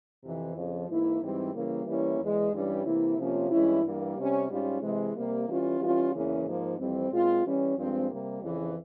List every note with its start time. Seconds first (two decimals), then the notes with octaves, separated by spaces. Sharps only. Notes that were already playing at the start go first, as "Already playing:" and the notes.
0.22 F2 C3 E3
0.55 F2 C#3 F3
0.88 G#2 E3 A#3 E4
1.21 G#2 E3 G3 C4
1.53 C#3 E3 G3 A#3
1.86 E3 G3 A#3 C#4 E4
2.20 E2 E3 G#3
2.52 G2 E3 G3 C#4
2.84 C3 E3 A#3 E4
3.18 C3 F3 A#3 C#4 F4
3.50 G2 E3 G#3 C#4 E4
3.83 G2 E3 G3 A#3
4.16 C3 G3 C#4
4.49 G#2 G3 C#4 F4
4.81 C3 E3 G#3
5.14 C3 G3 A#3
5.47 E3 G3 C#4 F4
5.80 E3 G3 C#4 F4
6.13 E2 C#3 E3 A#3 C#4
6.44 G#2 F3 A#3
6.78 F2 E3 G3 C4
7.11 A#2 G#3 C4 F4
7.44 E3 G3 C#4
7.75 G2 F3 G#3 C4
8.08 C3 G3 A#3
8.41 F2 C#3 E3